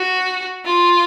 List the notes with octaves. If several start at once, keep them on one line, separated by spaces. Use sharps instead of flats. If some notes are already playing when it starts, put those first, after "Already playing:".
Already playing: F#4
F4